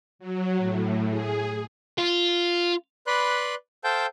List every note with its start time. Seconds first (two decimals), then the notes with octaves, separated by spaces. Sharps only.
0.19 F#3
0.58 A2
1.09 G#4
1.98 F4
3.07 B4 D5 B5 C6 F#6
3.84 A4 C5 F5 G5 A5 G6